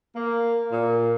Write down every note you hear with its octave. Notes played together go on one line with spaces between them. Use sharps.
A#3
A#2